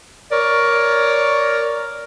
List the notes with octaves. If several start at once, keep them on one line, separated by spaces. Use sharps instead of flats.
A#4 C#5 D5